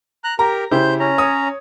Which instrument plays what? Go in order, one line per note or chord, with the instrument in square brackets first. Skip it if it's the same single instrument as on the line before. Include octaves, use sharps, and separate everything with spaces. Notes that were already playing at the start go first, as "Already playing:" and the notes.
[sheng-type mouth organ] A#5 F#6
[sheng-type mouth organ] G4 A#4 [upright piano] A#5
[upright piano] C#3 E4 G4 [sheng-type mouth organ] C5 G6
[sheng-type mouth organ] C#4 A#5
[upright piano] C#5 D#6